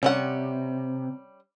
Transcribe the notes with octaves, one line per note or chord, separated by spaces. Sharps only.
C3 G3 C#4 F#5